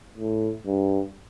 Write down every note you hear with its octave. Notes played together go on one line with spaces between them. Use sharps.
A2
G2